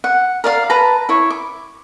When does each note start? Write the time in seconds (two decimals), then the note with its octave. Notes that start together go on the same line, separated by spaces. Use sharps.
0.04 F#5
0.44 A#4 D5 F5
0.70 B4 A5 A#5
1.09 E4 C#5
1.30 D6